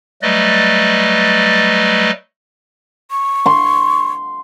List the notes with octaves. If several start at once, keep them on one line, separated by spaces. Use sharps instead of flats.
F#3 G3 A3 B4 D5 D#5
C#6
C6